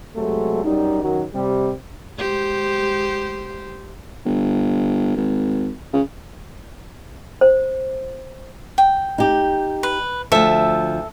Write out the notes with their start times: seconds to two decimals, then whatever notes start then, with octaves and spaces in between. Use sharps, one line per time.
0.17 C3 F#3 G#3 A3
0.64 F#2 G3 D#4
1.03 F#2 D#3 F#3
1.33 C3 G3
2.17 G#3 G4 C5
4.26 G1
5.16 G#1
5.93 C#3
7.41 C5
8.78 G5
9.18 D#4 G4
9.83 B4
10.32 D2 F3 A4 E5